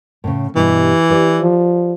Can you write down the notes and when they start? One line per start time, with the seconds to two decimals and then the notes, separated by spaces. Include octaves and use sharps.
0.24 A2 C#3
0.55 G2 B2 E3 G3
1.10 G4 B4 D5
1.41 F3